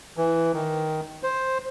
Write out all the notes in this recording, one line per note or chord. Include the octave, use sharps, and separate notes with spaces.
E3
D#3
C5